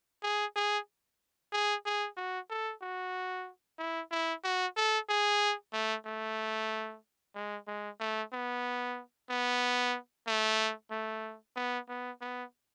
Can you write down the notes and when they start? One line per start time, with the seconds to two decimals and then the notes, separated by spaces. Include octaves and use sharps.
0.23 G#4
0.56 G#4
1.52 G#4
1.86 G#4
2.17 F#4
2.50 A4
2.82 F#4
3.79 E4
4.11 E4
4.44 F#4
4.76 A4
5.09 G#4
5.73 A3
6.06 A3
7.35 G#3
7.67 G#3
8.00 A3
8.33 B3
9.30 B3
10.27 A3
10.91 A3
11.56 B3
11.89 B3
12.21 B3